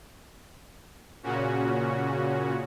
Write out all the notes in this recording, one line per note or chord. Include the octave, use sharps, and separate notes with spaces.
A#2 C#3 C#4 F#4